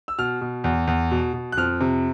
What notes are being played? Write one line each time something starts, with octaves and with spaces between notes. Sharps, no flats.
E6
B2 F6
B2
E2
E2
B2
B2
F#6
F2 F6
C3